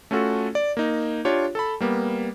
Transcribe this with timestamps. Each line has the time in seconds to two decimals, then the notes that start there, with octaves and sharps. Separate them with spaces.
0.11 A3 C#4 F4 F#4 A4
0.55 D5
0.77 A#3 D#4
1.25 D4 F4 G4 C#5
1.55 A4 A5 B5
1.80 G3 A#3 B3